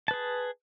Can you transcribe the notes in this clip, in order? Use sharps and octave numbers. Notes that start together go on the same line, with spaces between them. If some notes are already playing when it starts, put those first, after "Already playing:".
G#4 B4 A5